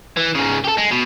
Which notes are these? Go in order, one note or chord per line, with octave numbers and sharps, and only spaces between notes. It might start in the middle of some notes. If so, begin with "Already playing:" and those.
E3
G#2 C#3
G4 A4
G#3
B2